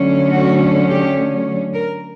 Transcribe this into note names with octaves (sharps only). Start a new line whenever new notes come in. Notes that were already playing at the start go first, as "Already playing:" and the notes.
Already playing: D3 F#3 A3 C#4
F#4
G4
A#4